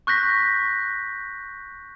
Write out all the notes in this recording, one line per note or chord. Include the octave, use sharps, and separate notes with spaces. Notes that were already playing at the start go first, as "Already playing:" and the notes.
C#6 F#6 G6 A#6 B6